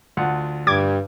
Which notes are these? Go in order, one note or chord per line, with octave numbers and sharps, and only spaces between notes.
D2 F4 F#5
G2 G3 D6 G#6